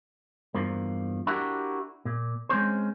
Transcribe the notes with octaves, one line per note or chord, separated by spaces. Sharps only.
E2 G2 F3 A#3
D4 E4 F#4 G4 A#4
A#2
G#3 C4 C#4 C5